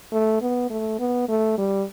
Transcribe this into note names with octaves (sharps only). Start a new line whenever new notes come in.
A3
B3
A3
B3
A3
G3